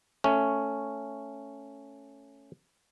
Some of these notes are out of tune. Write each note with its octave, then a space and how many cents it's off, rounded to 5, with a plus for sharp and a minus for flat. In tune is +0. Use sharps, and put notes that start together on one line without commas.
A3 +10 C#4 +0